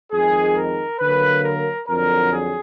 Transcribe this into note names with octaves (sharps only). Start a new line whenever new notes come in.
F2 D#3 G#3 G#4
A#4
D3 F#3 A#3 B4
A#4
F2 D3 F#3 A#4
G#4